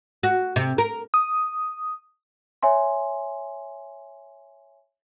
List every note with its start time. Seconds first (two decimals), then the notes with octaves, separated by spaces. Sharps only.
0.23 F#4
0.56 C3
0.78 A#4
1.14 D#6
2.62 C#5 E5 G#5 C6